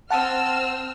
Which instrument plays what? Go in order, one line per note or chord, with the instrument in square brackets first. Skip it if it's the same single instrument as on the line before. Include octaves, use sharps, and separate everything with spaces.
[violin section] C4 E6 F6 [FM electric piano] F#5 A5